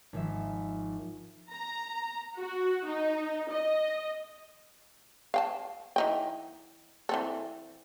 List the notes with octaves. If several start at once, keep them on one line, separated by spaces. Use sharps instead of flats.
G#1 F3 E5
A#5
F#4
D#4
D#5
F5 G5 A5
E3 D#4 G5
E3 C4 A4